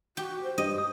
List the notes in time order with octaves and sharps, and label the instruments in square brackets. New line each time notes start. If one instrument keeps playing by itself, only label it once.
[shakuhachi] F#4 [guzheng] G4
[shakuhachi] C5
[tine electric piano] G2 G4 [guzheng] D#5
[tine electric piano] D#6